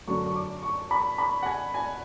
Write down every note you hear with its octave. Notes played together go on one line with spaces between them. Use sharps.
F#2 D3 F#3 A3 D4 C#6
C#6
D6
C#6
B5
B5
F#5
G#5
G#5